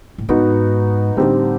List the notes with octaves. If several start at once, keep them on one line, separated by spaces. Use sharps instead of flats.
A2
G#2 B3 D#4 F#4
A2 D3 G3 C4 D#4 G4